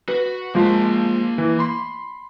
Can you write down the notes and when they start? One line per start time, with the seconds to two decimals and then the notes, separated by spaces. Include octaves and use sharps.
0.08 F#4 B4
0.55 F3 G#3 A#3 F4 A5
1.38 E3
1.59 B5 C6